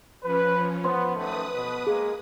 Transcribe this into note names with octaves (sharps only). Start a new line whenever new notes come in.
F3 C#4 B4
B3 C5 C6
F#2 D#3 A3 B4 D#6
B2
G#3 A#3 G#4